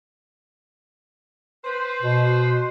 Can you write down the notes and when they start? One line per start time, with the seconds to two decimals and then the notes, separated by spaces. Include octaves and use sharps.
1.64 B4 C5
2.02 B2